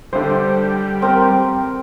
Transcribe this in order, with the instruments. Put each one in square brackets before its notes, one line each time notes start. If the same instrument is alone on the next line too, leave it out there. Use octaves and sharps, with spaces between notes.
[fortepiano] D3 C5 [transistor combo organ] G3
[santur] C4 A#4 G5